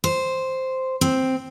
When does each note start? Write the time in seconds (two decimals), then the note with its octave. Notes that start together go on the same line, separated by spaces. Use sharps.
0.04 C5
1.01 C4